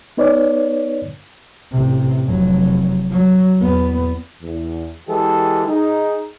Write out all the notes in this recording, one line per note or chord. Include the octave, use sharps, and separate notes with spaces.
B3 D#4 B4 C#5 D5
A1 C3
F1 F#3
F#3
E2 B3
E2
E3 G#3 G4 A4
D#4 G#4